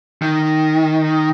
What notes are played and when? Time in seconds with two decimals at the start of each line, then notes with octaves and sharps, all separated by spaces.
0.22 D#3